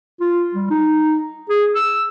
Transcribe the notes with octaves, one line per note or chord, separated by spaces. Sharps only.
F4
G3
D#4
G#4
E6